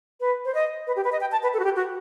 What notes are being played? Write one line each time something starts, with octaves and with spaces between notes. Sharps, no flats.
B4
C5
D#5
B4
G4
B4
D#5
G5
A5
B4
A4
F#4
G4
F#4